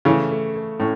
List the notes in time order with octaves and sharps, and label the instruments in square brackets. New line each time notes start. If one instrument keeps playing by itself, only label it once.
[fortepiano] C#3 E3 [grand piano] A3
[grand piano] A3
A3
[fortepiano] A2 [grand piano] C#4